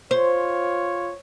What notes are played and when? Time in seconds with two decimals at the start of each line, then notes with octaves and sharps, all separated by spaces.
0.11 F4 C5 C#5